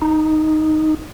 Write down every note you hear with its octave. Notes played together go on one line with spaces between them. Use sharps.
D#4